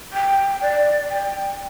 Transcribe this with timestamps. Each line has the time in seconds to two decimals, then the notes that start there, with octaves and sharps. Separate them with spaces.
0.13 G5
0.61 D5
1.09 G5